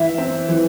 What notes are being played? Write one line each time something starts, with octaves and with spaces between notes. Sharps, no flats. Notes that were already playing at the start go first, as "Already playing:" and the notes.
Already playing: E3 E5
C4
E3